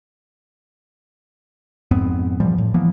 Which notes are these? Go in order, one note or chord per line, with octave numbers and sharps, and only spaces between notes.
F2 G#2 B3 C4
A#2 E3 F3 G3
A2
E3 F3 A#3 B3